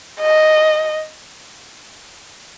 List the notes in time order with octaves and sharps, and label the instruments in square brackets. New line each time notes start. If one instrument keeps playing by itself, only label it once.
[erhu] D#5